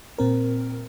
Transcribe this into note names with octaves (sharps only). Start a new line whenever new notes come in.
A#2 C4 A#4